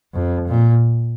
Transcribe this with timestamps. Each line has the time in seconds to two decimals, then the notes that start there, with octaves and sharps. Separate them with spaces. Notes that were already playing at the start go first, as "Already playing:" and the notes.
0.14 F2
0.47 A#2